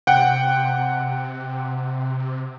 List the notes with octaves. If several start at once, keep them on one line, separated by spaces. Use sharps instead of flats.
C3 F#5 G5